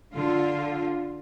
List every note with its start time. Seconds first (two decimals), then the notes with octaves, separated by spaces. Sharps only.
0.13 D3 F4